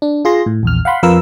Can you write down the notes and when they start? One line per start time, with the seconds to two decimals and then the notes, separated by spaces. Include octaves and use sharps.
0.02 D4
0.25 F4 G#4 C6 A#6
0.46 A2
0.63 A#1 E2 F6
0.85 F5 F#5 B5 C6
1.03 F2 F3 A#4 B4 F5 E6